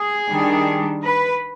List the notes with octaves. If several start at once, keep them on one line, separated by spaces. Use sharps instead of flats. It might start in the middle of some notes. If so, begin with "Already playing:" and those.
Already playing: G#4
D#3 G3 D4
B4